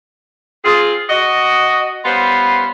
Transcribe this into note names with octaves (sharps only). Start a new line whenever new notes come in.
C4 F4 G#4
F#4 D#5
G3 B3 C#4 F4 B4 C5